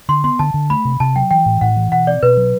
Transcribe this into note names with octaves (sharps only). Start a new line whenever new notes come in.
D3 C6
B3 C6
D3 A5
D3
A3 B5
C3
C3 A5
F#3 G5
E3 G5
A2
A2 F#5
E3
B2 F#5
C4 D5
B2 B4
F#3